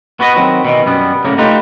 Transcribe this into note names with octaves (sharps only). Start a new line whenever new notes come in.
B3 F#4 B4 D#5
D#3 F#3 C4
B2 D#3 E3
F#2 B2 G3 B3
A2 C#3 F#3 A#3
A3 D#4 F4 G4 B4